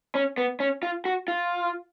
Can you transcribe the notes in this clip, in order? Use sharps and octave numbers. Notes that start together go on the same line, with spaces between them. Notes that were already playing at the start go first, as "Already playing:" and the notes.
C#4
B3
C#4
F4
F#4
F4